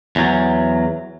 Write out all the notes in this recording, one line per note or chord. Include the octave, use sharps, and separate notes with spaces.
E2 F#3